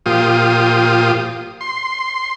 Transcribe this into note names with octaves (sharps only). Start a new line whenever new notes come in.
A#2 F3 F4 G4 D#6
C6